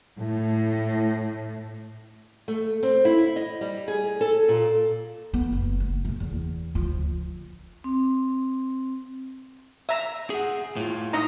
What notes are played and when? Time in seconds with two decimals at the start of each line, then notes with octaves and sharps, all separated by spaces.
0.18 A2
2.48 A3
2.83 C4
3.05 E4
3.36 D#5
3.61 G3
3.88 G#4
4.21 A4
4.48 A#2
5.33 B3
5.52 F#1
5.80 A3
6.05 B1 A3
6.20 E2
6.75 D2 F3
7.84 C4
9.89 E5 A#5
10.30 G#4 F#5
10.76 A2 F4
11.13 D#4 D#5 A#5